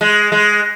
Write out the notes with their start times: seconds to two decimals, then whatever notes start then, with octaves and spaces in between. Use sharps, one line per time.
0.01 G#3
0.32 G#3